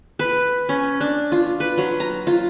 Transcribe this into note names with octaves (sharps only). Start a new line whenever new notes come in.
B4
C#4
D4
F4
B4
F#3
A#5
F4